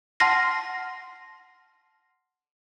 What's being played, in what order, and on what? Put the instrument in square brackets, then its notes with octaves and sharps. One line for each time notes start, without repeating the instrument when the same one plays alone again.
[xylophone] F#5 A5 C6 F6 A#6 C7